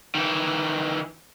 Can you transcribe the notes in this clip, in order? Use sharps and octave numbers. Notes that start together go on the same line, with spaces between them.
D#3 E3